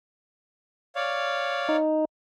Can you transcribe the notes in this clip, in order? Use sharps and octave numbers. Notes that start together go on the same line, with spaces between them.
C#5 D5 F5
D#4